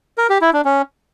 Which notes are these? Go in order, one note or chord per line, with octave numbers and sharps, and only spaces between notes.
A#4
G4
E4
D4
C#4